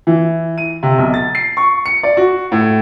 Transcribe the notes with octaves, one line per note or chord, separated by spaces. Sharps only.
E3
D#7
C3
B1
A6
C7
C#6
C#7
D5
F#4
A2